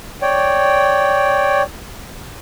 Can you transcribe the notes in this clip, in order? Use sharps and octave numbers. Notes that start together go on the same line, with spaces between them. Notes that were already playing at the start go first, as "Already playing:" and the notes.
C#5 D5 G5